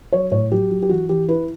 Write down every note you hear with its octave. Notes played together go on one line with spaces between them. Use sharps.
F#3 C#5
A2 C#5
F#3 G4
F#3
G4
E3 F#4
E3 G4
E4 B4